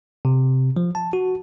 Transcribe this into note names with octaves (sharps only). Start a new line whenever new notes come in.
C3
F3
A5
F#4